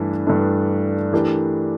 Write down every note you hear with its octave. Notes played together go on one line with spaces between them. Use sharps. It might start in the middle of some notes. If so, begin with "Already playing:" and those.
Already playing: G2 E3 A3 D4
G2 E3 A3 D4
E3 A3 D4 G4 A#4